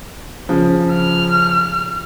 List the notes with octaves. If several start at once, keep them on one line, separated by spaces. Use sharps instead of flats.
C#3 F3
F6